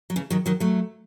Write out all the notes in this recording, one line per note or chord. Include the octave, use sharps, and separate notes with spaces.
F#3
C#3 E3
D#3 F#3
D#3 F#3
F#3 A3